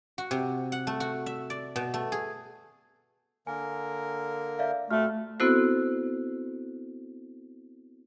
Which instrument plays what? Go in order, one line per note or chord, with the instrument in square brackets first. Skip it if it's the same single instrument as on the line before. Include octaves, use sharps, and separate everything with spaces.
[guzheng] F#4
C3
F#5
A3
F#4
E5
D5
B2
A3
G#4
[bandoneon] D3 A#3 A#4 [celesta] G#5
[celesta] D5 E5 F5
[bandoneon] A#2 C4 [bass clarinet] A3 [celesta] F#4 F6
[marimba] B3 C4 E4 F#4 A4 C5